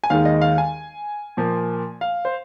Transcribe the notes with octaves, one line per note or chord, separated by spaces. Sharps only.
G#5
D#2 D#3 G#3 F5
D#5
F5
G#5
A#2 F3 A#3
F5
C5